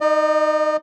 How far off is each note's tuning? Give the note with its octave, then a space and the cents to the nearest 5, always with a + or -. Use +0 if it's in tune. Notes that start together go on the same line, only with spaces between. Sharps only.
D#4 +0 D#5 -45